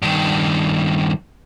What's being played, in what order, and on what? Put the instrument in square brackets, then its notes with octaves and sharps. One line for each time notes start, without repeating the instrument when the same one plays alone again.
[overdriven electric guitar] G2 D#3